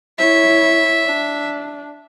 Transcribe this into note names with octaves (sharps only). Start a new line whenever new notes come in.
E4 C#5 E5
D4